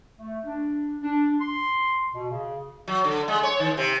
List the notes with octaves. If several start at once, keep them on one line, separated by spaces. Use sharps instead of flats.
A3
D4
D4
C6
B2
C#3
F#3
D3
G#3
C#5
D#3
C3